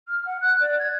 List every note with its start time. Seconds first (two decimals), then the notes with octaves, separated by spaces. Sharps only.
0.08 F6
0.25 F#5
0.41 F#6
0.60 D5
0.79 G#6